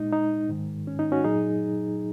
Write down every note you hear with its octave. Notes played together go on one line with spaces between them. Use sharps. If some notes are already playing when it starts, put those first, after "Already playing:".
Already playing: A#2 G#3 D#4
D#4
G#2 D#3 G#3
C#4
D#4
C#4 F#4
A#2 F#3 D#4 G#4